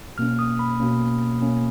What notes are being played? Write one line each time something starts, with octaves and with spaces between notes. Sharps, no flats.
B2 A#3 C#4 F6
D#6
B5
B2 A#3 C#4
B2 A#3 C#4